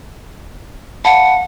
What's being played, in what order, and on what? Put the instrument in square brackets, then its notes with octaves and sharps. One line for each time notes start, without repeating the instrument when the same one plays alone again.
[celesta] F5 A5 B5 [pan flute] F#5